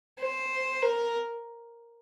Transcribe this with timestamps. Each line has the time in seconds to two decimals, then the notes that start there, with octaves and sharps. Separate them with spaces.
0.19 C5
0.83 A#4